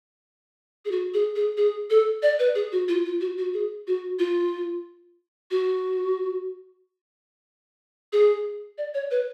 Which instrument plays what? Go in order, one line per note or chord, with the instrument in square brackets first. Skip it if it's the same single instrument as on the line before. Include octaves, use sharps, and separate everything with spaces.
[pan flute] G#4
F#4
G#4
G#4
G#4
A4
D5
B4
G#4
F#4
F4
F4
F#4
F#4
G#4
F#4
F4
F#4
G#4
D5
C#5
B4